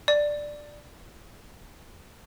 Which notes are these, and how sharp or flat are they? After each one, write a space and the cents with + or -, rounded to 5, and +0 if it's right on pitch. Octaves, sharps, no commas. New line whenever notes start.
D5 +5